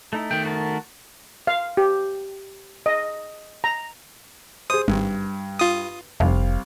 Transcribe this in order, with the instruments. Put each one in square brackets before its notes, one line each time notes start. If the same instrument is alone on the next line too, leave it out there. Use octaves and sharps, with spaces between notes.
[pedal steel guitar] A3 D#4 E4
[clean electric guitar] D#3 A3 [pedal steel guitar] G5
[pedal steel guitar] F#4 A#4 A5
[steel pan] F5
G4
D#5
A#5
[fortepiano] G#4 C5 [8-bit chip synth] D#6
[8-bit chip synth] G#1 [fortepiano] G2
[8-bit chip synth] F4 D#6
[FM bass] F1 [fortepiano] C2 F5